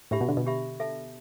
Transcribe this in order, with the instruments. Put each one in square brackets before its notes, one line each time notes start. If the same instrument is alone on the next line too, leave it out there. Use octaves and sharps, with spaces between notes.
[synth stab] A2 [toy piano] D4 G4 E5 B5
[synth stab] B2
D3
B2
[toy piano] D4 G4 E5 B5
A4 E5 A5